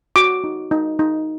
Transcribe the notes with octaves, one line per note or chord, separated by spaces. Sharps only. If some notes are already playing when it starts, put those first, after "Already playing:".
F#4 D6
D#4
D#4
D#4